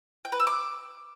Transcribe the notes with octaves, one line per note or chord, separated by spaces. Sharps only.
G5
B4
E6
D6